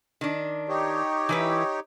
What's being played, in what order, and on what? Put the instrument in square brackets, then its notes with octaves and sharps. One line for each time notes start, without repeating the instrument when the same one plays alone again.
[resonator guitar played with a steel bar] D#3 D4
[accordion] D#4 G4 C#5
[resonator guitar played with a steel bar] E3 E4 B4